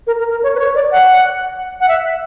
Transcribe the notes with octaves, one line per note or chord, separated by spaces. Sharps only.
A#4
A#4
A#4
C#5
B4
C#5
D5
F#5
F#5
E5